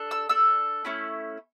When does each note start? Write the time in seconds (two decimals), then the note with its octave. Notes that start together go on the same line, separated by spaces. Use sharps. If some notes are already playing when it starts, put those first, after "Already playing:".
Already playing: D4 A4
0.11 E6
0.29 D4 A4 E6
0.85 A3 C#4 E4